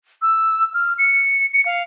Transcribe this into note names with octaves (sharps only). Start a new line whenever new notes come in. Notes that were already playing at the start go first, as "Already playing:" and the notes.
E6
F6
C#7
C#7
F5